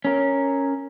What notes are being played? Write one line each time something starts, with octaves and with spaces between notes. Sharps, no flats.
C#4 A#4